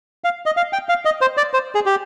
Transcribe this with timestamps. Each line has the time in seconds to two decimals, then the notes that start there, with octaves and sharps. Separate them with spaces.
0.24 F5
0.46 D#5
0.57 F5
0.73 G5
0.89 F5
1.05 D#5
1.21 C5
1.37 D5
1.53 C5
1.75 G#4
1.86 G4